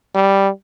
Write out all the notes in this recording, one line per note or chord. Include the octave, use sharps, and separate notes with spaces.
G3